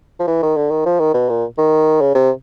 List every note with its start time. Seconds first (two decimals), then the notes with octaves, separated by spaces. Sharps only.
0.20 F3
0.28 E3
0.43 D#3
0.57 D3
0.71 D#3
0.86 F3
1.00 D#3
1.14 B2
1.30 A#2
1.58 D#3
2.01 C#3
2.15 C3